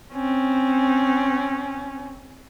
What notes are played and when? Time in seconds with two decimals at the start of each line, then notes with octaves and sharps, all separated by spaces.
0.13 C4 C#4